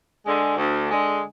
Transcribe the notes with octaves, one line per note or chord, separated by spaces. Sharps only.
D3 G#3
D2
D3 G#3